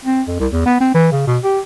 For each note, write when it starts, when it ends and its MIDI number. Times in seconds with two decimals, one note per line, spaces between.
0.05 0.22 60
0.28 0.37 41
0.39 0.47 36
0.52 0.64 40
0.66 0.77 59
0.81 0.91 60
0.95 1.09 52
1.12 1.23 49
1.27 1.38 47
1.44 1.60 67